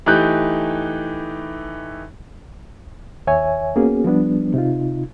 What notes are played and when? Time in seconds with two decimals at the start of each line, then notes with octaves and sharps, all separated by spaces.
0.06 E3 A3 D#4 G4 F#6 G6
3.27 D#2 C#5 E5 G#5
3.76 A#3 B3 C#4 F#4 G#4
4.04 F3 G3 B3 D4
4.54 C3 D#4 F4